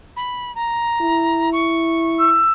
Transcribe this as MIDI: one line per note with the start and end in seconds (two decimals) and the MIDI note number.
0.16 0.54 83
0.55 1.49 82
1.02 2.43 64
1.52 2.29 85
2.19 2.52 88